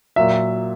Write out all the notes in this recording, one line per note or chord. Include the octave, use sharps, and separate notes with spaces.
A#2 F#3 E5